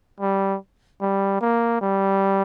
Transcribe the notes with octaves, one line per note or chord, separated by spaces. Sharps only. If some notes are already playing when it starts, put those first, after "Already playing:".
G3
G3
A#3
G3